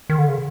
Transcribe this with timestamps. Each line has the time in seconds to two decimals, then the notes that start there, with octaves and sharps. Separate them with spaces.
0.10 D#3
0.18 D3
0.28 C#3